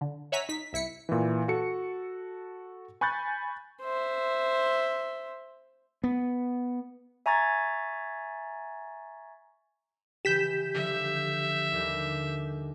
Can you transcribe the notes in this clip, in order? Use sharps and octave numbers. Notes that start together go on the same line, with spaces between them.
D3
C#5 E5 F#5 G#5 A#5 B6
D#4 B6
C2 E4 B6 C#7
A#2 E3
F#4 A4 C#7
G#5 B5 C#6 F#6 G6 A6
C5 E5
B3
E5 G#5 A#5 C#6 G#6 A6
C#3 E3 G4 G6 B6 E7
D3 F3 G3 E5
D#2 D3 G3